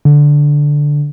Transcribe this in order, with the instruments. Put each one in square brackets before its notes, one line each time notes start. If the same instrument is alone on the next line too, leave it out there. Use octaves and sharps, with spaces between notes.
[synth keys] D3